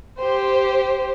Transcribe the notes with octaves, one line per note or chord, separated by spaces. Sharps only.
G4 C5